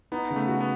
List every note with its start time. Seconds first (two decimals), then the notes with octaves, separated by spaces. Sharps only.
0.12 B3 D#4
0.30 C#3
0.36 A3
0.48 F#4
0.61 B3